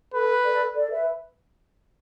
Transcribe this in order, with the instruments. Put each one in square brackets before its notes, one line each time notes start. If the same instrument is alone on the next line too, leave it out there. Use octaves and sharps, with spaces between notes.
[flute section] A4 [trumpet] B4
[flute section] A4 D5
A4 D5
B4 E5